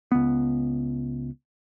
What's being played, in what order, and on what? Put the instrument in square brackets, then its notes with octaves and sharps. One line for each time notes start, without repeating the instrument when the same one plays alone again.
[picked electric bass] C#2 B3